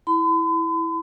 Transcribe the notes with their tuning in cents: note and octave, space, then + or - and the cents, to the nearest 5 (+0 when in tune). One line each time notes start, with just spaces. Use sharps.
E4 -5 B5 +45